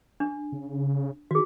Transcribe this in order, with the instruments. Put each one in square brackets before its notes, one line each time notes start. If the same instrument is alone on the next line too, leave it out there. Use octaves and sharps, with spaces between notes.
[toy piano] D4
[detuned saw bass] C#3
[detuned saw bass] D#3 [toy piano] F#4 G#4